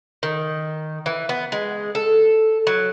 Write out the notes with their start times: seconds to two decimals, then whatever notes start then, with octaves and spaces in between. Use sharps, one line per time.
0.23 D#3
1.06 E3
1.29 B3
1.52 G#3
1.95 A4
2.67 F#3